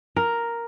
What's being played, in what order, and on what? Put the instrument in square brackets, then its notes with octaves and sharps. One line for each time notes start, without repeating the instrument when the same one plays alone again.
[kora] A#4